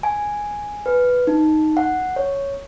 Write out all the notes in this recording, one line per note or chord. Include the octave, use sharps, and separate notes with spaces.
G#5
B4
D#4
F#5
C#5